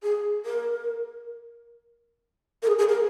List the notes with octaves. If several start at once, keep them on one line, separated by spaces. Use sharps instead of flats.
G#4
A#4
A#4
G#4
G#4
A#4